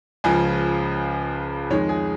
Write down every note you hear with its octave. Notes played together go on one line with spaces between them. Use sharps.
C#2 C#3 F3 G#5
F2 D#3 G#3 C#5
G#4